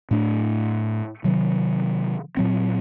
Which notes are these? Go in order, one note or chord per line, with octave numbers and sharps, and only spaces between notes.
A2 A3 D4
C3 D#3 F#3
A#2 F#3 C4